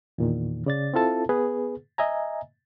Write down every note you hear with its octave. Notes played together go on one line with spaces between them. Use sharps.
E2 A#2 D#3
C#3 D5 A6
C4 E4 F4 A4 A5
B3 G#4 B4
D#5 E5 G#5 A#5